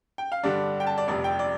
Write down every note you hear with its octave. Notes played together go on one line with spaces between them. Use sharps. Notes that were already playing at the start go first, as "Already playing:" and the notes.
G5
F5
G2 D3 G3 D4 D5
G5
A5
D5
F1 F2 C3 D5
G5
D5